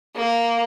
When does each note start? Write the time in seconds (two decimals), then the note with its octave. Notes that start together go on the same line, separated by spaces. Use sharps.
0.15 A#3